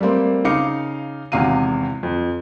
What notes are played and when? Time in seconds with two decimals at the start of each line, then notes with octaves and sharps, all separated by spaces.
0.01 G3 A3 A#3 C4
0.45 C#3 D#4 F5 D6 C#7
1.32 G#1 E2 C3 F5 A#5 D#7
2.03 F2